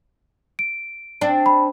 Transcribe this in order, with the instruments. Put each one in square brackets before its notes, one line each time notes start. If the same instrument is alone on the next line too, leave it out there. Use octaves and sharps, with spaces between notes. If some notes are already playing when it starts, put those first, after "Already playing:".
[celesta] D7
[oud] C4 D4
[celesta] B5